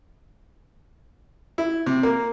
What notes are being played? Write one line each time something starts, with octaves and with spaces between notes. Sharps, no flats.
E4
C3
A#3